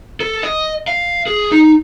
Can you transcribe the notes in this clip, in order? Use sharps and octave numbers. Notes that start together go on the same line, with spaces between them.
A4
D#5
F5
G#4
D#4